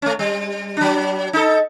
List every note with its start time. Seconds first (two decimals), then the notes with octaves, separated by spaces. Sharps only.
0.02 A3 C#4
0.19 G3
0.77 F#3 D4
1.33 D#4 A4